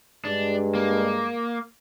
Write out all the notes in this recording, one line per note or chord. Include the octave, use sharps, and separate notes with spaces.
G2 G#3 D4
A#3